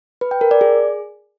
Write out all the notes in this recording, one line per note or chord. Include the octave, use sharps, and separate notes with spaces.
B4
G5
A#4
D5
G#4